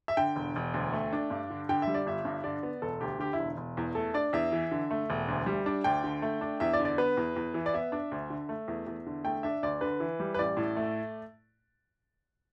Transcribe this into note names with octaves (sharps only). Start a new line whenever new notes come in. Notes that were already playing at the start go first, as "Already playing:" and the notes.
E5
D3 G5
E1
E1
D2
A3
D4
G2
D3
D3 G5
E5
G3
D5
G1 E5
G2
D3 D5
B3
E1 A4
D2 G4
D3 G4
E4
E1
E1
E2
A3 A4
D4 D5
E2 E5
E3
D3
A3
E1
D2
G3
D4
D2 G5
D3
A3
D4
E2 E5
D5
D3
D5
B3 B4
E2
E2
E3
D5
B3 E5
D4
D2
D3
A3
E2
E2
D3
A3 G5
D4 E5
D2 D5
D3 B4
E3
G3
B4
A1 D5
A2
A3